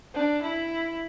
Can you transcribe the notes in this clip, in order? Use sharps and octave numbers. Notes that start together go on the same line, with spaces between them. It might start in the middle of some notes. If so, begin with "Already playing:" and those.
D4
E4